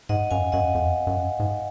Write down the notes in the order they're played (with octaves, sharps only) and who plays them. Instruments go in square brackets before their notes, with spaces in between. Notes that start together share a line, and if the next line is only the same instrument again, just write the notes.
[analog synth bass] G#2 [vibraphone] D#5 F#5
[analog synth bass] F#2 [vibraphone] F5 G#5
[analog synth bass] F#2 [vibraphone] D#5 F#5
[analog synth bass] F2
F#2
G#2